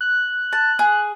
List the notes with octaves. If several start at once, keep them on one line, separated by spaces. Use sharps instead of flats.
F#6
A5
G#4